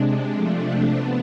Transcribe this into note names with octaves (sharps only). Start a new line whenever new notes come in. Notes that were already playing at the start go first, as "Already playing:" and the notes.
Already playing: C3 G#3 D4
C3 F3 A3 D4
D4
B3